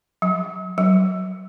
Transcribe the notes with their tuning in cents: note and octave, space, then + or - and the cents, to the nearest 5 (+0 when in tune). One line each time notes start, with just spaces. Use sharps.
F#3 -5
F#3 +20